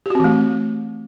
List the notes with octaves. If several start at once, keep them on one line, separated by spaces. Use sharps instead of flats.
E3 A3 C4 F#4 G4